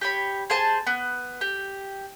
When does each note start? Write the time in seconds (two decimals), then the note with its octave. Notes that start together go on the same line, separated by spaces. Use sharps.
0.01 G4 C#5 B5
0.50 G#4 C5 G#5 A5
0.87 B3
1.41 G4